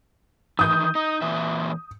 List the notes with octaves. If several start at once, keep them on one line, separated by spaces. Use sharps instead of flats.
D#3 E3 D#6 G6
D#4
A#2 E3 E5